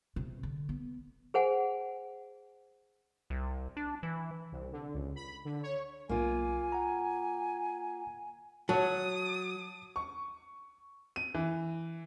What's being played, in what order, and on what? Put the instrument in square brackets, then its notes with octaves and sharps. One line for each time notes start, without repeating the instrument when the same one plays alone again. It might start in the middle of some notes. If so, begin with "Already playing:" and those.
[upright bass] C3
D3
B3
[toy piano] G#4 C5 F#5 G#5
[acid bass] C2
D4
E3
[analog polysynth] C2
D3
C#2
B5
D3
C#5
[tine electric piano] B1 [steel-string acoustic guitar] A#3 F4 [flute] G#5
[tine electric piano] F#5 A#5
[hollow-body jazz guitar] F#3 [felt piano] C#5 A5 [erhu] D#6
[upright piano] C#6
D#7
E3